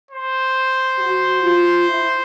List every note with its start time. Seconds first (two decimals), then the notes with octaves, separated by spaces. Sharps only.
0.11 C5
0.99 F#4
1.43 F4
1.88 E4